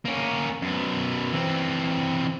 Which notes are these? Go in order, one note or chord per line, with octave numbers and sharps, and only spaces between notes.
A#3 C#4
F#2 B3
E3 C4